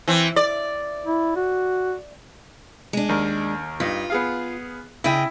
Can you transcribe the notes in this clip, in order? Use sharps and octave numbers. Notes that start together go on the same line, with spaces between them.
E3 C4
D5
E4
F#4
G#3 D4
D#2 A#4
G2 D#4 F4
B3 G#4 F5
C#3 E4 D#5 E5 G5